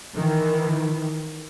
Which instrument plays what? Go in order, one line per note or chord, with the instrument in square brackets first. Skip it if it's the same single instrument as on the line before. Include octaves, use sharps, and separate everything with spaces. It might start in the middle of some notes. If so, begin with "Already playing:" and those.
[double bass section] D#3 E3